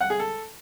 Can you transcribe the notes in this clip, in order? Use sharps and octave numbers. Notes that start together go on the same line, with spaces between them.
F#5
G#4
A4